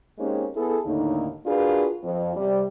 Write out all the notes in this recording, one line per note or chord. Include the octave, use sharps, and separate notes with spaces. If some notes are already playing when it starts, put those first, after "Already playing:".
G#3 A#3 C4 C#4 D#4 G4
B3 E4 G#4 A4
D#2 A2 D3 A#3 D#4
D4 F4 F#4 G#4 A#4 B4
F2
C3 G3